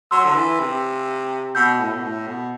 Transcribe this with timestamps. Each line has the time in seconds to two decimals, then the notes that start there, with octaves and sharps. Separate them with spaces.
0.11 F#3 C6 E6
0.25 D3
0.35 E3
0.60 C3
1.55 B2 E6 G6
1.80 A2
1.93 B2
2.03 A2
2.27 B2